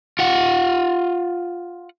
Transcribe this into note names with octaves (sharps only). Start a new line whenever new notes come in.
F4 F#5